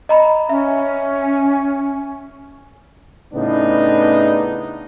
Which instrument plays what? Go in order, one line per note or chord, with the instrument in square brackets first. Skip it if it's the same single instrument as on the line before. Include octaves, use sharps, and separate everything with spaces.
[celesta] D#5 A#5 B5
[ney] C#4 [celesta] E5
[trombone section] A2 C#3 B3 D4 D#4